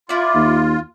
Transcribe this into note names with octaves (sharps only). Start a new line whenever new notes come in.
E4 F4 D5
D#2